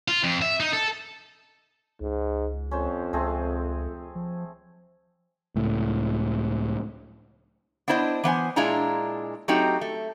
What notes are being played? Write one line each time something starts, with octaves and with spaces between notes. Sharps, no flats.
F4
F2
E5
D#4
A4
C#2 G#2
F2 C#4 C5
C#2 A3 C4 G#4
F3
C#2 A2
B3 D4 E4 C5 D#5
E3 B3 C5 G#5
A#2 G#3 D4 E4 F4 A#5
F#3 A3 C4 D#4 F#4 G4
A3